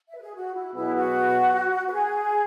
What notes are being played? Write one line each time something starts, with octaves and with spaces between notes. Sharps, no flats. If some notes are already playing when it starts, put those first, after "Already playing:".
E5
B4
G#4
F#4
E4
B2 F#3 B3 E4 G#4 B4
F#4
B4
G#4